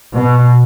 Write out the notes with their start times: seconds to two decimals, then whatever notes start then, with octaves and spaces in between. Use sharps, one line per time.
0.14 B2